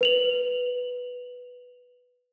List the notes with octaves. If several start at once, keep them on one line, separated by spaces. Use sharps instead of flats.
B4 F7 F#7